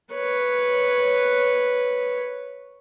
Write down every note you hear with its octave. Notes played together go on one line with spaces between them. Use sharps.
B4 C#5